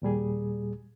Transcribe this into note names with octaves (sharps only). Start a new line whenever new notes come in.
D#2 A#2 G3 G#4